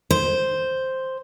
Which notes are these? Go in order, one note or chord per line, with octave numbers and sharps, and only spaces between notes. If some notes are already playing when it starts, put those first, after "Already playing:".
C5